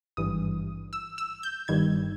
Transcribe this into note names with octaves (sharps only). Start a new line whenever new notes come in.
G#1 G2 E3 D#6
E6
E6
G6
G1 G2 D#3 G3 G#6